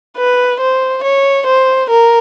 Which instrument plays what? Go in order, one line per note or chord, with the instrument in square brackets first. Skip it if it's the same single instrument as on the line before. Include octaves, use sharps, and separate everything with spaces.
[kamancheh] B4
C5
C#5
C5
A#4